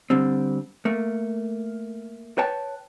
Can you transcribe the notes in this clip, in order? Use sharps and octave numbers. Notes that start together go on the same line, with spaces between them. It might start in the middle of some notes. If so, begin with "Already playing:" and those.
D3 G3 C4
A3 A#3
B4 C#5 G5 A5